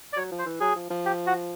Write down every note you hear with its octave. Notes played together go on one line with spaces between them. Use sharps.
D5
F#3 C#5
F3
C5
E3
F#3 G#4
F3
F3
G4
F#4